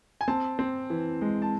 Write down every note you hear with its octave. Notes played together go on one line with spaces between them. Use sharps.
G#5
C4 A5
C4
E3
G#3
A5